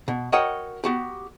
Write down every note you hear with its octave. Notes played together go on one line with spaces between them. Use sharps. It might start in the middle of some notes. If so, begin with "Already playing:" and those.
B2
F#4 A#4 C#5 D#5 F#5 G5
B3 F#4 G4